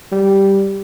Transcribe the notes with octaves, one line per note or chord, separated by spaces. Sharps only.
G3